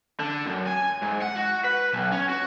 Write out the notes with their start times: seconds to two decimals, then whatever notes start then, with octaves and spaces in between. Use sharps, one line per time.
0.20 D3
0.46 F#2
0.66 G#5
1.02 G#2
1.21 F#5
1.36 F#4
1.64 B4
1.93 B1
2.12 C#4
2.29 F#4